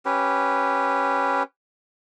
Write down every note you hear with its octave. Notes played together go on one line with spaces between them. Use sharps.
C#4 G4 B4